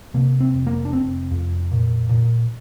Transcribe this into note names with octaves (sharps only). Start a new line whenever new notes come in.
C3 A#3
C4
F1
A#3
D4
F1 C4
F2
A#2
A#2